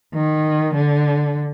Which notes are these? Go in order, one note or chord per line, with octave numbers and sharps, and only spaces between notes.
D#3
D3